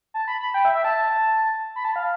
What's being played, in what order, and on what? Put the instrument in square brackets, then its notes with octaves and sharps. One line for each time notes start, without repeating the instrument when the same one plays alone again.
[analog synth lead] A5
B5
B5
G5
E5
E5
A5
B5
A5
F5